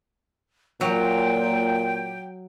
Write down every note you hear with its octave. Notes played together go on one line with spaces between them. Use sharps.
A#2 F#3 G5